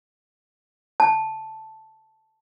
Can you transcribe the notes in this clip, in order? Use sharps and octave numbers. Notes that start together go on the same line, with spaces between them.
A5